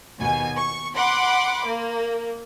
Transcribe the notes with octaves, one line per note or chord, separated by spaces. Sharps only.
D#2 B2 G#5
C#6
F#5 B5 C6 D6
A#3